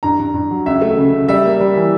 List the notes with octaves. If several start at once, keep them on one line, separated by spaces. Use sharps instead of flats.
G2 A#5
G2
G2
F#3
C#2 E5
A3
C#3
C#3
G3 E5
A#3
G3
E3